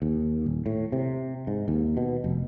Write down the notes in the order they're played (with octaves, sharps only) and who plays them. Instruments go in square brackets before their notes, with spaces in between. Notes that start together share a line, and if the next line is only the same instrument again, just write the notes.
[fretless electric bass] D#2
D#1
A2
C3
G#2
D#2
B2
F1